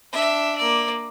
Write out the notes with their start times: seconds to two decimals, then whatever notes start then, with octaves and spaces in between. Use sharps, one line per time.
0.13 D4 E5
0.58 A#3 D5